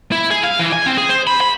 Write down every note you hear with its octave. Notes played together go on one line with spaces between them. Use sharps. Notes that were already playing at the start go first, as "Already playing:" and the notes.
E4
G#4
F5
E3
G#5
C4
G#4
C5
B5
B5